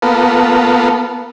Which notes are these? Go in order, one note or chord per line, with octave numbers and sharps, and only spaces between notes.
A#3 B3 F4 A4